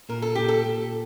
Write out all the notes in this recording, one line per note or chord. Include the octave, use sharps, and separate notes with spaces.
A#2 A#4
A4
A#2 G4
A4
A#2